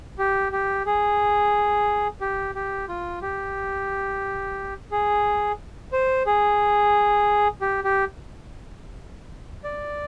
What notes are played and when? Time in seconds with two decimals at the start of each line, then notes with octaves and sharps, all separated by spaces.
0.19 G4
0.52 G4
0.86 G#4
2.21 G4
2.55 G4
2.89 F4
3.22 G4
4.91 G#4
5.93 C5
6.26 G#4
7.61 G4
7.84 G4
9.64 D5